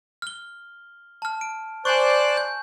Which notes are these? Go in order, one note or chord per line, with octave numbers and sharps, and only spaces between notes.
F6 G7
A5 F6
D7
C5 D5 G#5 C#6 F#6
G6